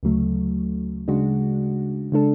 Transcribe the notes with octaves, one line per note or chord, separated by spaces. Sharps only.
D2 C#3 F#3 A3
C#3 G#3 D4 F#4
C#3 G#3 D4 A4